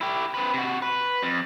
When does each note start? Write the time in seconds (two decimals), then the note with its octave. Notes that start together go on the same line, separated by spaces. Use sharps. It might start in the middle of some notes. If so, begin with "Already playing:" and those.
0.01 E4 G4
0.34 C4 B4
0.54 C3 F#4
0.82 B4
1.23 F2